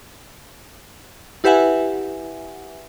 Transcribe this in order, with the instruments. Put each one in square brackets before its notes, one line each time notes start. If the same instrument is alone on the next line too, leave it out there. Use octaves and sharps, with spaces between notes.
[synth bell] E4 G4 B4 E5 F#5 G#5